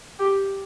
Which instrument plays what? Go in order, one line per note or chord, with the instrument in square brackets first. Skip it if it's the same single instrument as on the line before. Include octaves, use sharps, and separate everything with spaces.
[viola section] G4